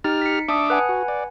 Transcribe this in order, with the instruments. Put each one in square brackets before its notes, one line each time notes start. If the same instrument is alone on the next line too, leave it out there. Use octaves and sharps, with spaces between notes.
[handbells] D#4 [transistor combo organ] G4 F6
[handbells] B6 C#7
[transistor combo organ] D4 E5 D6 [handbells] A5 D#6
[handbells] B4 F#5 G#5
[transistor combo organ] F#4
D5